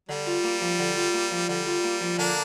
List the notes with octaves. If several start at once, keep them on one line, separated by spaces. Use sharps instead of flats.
D3 G3
F4
A#3
F3
D3
F4
A#3
F3
D3 G3
F4
A#3
F3
D3 A#3 D4